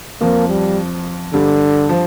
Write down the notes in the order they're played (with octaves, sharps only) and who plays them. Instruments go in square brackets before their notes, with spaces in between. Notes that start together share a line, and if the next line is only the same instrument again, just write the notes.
[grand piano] F2 F3 [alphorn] A#3
[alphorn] G3
[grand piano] G2 G3 [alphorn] D3
[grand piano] F3